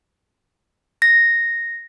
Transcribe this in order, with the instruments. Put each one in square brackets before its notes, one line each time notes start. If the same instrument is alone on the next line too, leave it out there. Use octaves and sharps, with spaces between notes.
[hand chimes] A#6